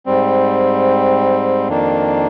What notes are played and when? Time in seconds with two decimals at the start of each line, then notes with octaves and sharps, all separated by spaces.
0.06 G#2 G3 C4
1.68 F2 D#3 A#3 D4